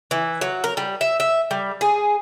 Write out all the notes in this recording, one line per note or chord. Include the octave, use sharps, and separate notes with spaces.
E3
F#3
A#4
G3
E5
E5
G3
G#4